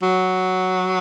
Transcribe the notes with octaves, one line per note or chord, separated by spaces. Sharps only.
F#3